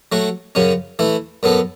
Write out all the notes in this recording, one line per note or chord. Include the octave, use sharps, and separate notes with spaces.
F#3 A3 F#4
F#2 C#3 F#3 C#4
E3 A3 E4
F#2 F#3 B3 A4